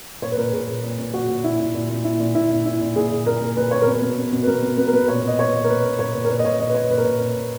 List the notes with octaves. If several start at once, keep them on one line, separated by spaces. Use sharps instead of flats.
A#2 C#5
B4
A#2 A#4
A#2 G#4
A#2
A#2
A#2
A#2 F#4
A#2
A#2 E4
A#2
A#2
A#2
A#2 E4
A#2
A#2 E4
A#2
A#2 E4
A#2
A#2 G#4
A#2
A#2 A#4
A#2
A#2 B4
A#2 C#5
A#4
B2 B4
B2
B2
B2
B4
B2 A#4
B2
B2 B4
A#4
B2 B4
A#2 C#5
A#2 D#5
A#2 C#5
A#2
A#4
A#2 B4
A#2
A#2 C#5
A#2
A#4
A#2 B4
D#5
A#2 C#5
A#2 D#5
B4
A#2 C#5
A#2 B4
A#4
A#2 B4
A#2
A#2